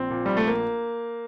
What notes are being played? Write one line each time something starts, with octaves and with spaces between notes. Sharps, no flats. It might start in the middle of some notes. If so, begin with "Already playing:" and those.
Already playing: A#1 C4
A#2
A#1 G3
A3
A#3